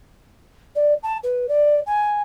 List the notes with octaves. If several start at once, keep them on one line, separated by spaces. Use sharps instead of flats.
D5
A5
B4
D5
G#5